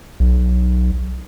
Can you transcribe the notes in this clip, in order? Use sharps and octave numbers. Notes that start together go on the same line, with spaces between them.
B1